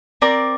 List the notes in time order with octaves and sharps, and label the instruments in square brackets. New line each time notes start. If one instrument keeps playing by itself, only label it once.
[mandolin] C4 A#4 D5